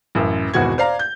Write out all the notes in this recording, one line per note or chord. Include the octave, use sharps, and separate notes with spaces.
A1 F#2
G#1 E2 B2 F#4 F#5 G#6
C5 D5 F5 A#5
G6